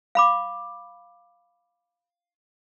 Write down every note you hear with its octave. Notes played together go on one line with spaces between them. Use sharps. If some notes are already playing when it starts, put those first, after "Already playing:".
F5 B5 D6